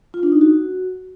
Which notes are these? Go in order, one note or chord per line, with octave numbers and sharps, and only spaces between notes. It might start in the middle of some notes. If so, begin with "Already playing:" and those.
F4
D4
D#4
F#4